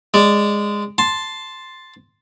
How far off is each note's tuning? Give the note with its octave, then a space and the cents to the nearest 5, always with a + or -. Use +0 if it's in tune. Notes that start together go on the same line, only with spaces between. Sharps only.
G#3 -10 D5 +0
A5 +0 C6 +0